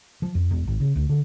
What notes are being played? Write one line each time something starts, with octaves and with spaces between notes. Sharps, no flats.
F3
F2
E1
G#1
C#3
D2
D3